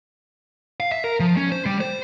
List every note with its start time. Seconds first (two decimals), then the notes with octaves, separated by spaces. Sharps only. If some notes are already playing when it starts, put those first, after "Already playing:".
0.80 F5
0.92 E5
1.04 A#4
1.20 F3
1.37 C#4
1.52 C5
1.66 G3
1.81 C5